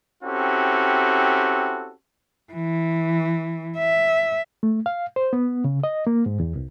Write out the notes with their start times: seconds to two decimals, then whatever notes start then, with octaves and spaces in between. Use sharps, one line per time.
0.23 C4 C#4 E4 F#4 G4 A4
2.53 E3
3.78 E5
4.63 A3
4.86 F5
5.16 C5
5.33 B3
5.64 C#3
5.84 D#5
6.07 A#3
6.26 G#2
6.40 E2
6.56 C2